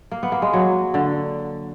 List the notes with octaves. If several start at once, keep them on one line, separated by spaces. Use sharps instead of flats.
A#3
B3
A#3
G#3
F#3
D3